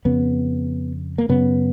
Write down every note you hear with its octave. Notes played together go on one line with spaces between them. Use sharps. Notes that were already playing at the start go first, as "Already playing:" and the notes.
F2 C#3 B3
A#3
F#2 C#3 B3